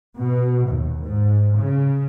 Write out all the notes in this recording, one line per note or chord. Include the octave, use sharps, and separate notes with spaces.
B2
D#2
G#2
C#3